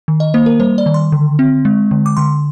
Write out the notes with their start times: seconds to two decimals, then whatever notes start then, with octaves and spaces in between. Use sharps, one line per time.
0.08 D#3
0.20 D#5
0.34 A#3 C5
0.46 A#4
0.60 G3 C5
0.78 D5
0.86 D#3
0.94 C6
1.12 D3
1.39 C4
1.65 G#3
1.91 D3
2.06 D6
2.17 D3 C6